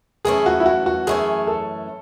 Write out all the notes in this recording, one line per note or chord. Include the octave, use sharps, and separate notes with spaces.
F#2 E3 A3 C#4 G#4
F#4
E4
F#4
F#4
F#2 E3 A3 C#4 G#4
A4